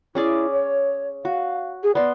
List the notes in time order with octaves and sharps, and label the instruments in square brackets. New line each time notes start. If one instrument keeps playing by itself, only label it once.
[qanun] C#4 G#4 D5 [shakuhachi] E4
[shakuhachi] C#5
[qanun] F#4 [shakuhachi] F5
[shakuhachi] G#4
[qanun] B3 C6 [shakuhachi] D5